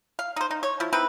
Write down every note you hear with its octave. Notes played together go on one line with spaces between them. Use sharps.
F5
D#4 C5
D#4
C#5
F3 E4
C4 D#4 E4 B4